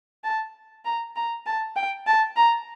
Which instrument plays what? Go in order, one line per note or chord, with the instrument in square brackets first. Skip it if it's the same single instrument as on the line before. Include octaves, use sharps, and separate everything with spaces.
[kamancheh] A5
A#5
A#5
A5
G5
A5
A#5